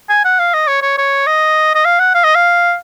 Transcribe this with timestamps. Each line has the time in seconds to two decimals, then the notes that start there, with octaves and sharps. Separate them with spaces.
0.09 G#5
0.24 F#5
0.39 F5
0.54 D#5
0.67 C#5
0.82 C#5
0.98 C#5
1.27 D#5
1.75 D#5
1.85 F5
1.99 F#5
2.14 F5
2.24 D#5
2.35 F5